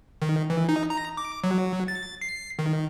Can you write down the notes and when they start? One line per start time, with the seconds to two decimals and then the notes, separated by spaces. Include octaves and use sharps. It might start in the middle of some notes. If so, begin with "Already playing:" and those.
0.22 D#3
0.50 E3
0.69 D#4
0.90 A#5
1.17 D6
1.44 F#3
1.88 A6
2.21 C7
2.59 D#3